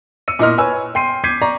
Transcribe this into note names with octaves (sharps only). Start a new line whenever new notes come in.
E6 C#7 D#7
A#2 E4 A#4 D#5 C6 F6
B4 C#5 G#5 E6
G5 C6 C7 D#7
D6 G6 G#6 B6 C7 D#7
D5 A#5 C#6